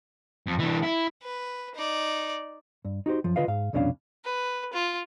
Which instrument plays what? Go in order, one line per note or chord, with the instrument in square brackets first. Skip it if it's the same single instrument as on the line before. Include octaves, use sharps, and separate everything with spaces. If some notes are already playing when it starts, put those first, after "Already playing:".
[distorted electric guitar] F2
E3 D4
E4
[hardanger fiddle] B4
D#4 D5
[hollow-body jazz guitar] G2
D#4 F#4 G4 C5
F#2 F3
D3 F4 B4 D#5 F5
G#2 F5
C2 F2 B2 C#4 D4 F5
[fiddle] B4
F4